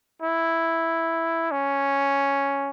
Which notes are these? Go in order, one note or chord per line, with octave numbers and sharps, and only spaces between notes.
E4
C#4